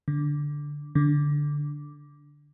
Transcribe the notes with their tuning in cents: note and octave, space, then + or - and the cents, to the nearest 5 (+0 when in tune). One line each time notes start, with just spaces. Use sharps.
D3 -5
D3 -5